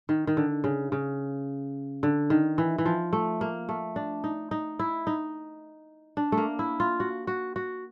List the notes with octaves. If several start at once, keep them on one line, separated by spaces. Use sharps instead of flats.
D#3
D#3
D3
C#3
C#3
D3
D#3
E3
E3
F3
A3
A#3
A3
D4
D#4
D#4
E4
D#4
D4
A3
A#3
E4
F4
F#4
F#4
F#4